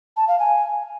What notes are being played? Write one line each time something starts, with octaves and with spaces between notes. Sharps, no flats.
A5
F5
G#5